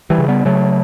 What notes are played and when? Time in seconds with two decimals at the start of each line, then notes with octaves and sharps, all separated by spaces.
0.10 E3 G3
0.19 C#3
0.28 G3 B3
0.45 C#3 F#3 A3